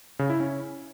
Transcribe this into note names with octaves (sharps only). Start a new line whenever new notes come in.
C#3
E4
C#4